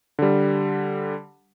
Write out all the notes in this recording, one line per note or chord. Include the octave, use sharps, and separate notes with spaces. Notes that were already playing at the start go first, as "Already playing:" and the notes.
D3 G3